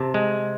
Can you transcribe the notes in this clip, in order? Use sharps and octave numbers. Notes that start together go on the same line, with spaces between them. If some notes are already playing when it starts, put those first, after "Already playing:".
Already playing: C3 A5
G#3